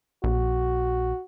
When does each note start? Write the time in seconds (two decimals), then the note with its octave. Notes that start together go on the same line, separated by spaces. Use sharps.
0.24 A#1 F#4